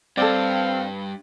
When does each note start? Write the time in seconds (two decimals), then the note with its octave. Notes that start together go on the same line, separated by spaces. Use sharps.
0.17 G2 C4 A4 D5 F5